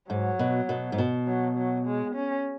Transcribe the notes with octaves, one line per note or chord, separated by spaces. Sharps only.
G#2 F#3
B2
B2
G#2
B2
F#3
F#3
G#3
C#4